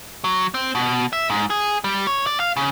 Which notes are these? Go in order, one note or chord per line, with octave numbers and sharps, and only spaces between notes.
F#3
C4
B2
E5
G#2
G#4
G3
C#5
D5
F5
C#3